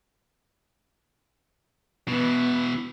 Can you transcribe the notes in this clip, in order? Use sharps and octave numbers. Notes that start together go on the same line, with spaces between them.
B2 E3 B3